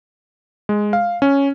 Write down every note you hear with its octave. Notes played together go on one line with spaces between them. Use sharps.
G#3
F5
C#4